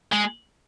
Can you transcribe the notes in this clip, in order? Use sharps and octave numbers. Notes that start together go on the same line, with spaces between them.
G#3